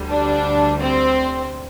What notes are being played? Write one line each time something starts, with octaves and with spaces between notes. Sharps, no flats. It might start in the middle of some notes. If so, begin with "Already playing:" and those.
Already playing: D2 D3 G3
D4
C4